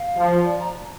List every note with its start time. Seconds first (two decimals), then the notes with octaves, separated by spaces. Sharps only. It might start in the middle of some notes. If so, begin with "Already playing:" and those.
Already playing: F5
0.17 F3
0.45 D5
0.60 A#5